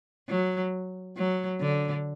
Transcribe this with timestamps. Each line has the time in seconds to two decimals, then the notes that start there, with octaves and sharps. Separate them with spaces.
0.29 F#3
1.16 F#3
1.61 D3